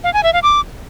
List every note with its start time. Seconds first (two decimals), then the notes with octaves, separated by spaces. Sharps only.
0.04 F5
0.14 G#5
0.23 E5
0.33 F5
0.43 D6